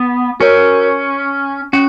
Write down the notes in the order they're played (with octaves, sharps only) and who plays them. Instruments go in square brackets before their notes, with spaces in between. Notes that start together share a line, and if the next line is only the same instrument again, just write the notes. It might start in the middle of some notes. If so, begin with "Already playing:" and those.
Already playing: [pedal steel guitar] B3
[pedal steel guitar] C#4 [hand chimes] F#4 A#4 C#5
[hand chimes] C#4 [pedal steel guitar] F#4